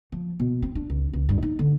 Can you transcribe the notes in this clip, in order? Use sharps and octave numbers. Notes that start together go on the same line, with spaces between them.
F3
B2
C4
D4
C#2
C#2
G2
D#4
D3